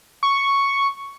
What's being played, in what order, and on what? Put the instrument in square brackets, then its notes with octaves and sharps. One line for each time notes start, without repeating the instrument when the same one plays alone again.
[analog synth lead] C#6